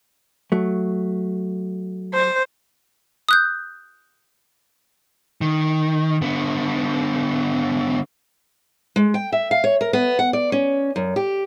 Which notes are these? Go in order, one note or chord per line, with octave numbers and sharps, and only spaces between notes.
F#3 A3
C5
D#6 F#6 G6
D#3
D3 B3
G#3
G5
E5
F5
C#5
A#4
B3
F#5
D5
C#4
F#2
G4